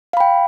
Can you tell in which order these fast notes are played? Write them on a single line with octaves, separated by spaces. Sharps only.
F5 B5 G5